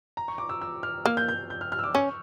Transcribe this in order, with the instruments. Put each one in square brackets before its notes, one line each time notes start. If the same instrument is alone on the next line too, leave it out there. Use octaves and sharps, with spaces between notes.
[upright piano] A#5
C#6
D6
E6
E6
F6
[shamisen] A#3 [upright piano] F6
[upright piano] G6
G6
G6
F6
F6
E6
D6
[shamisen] C#4 [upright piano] C#6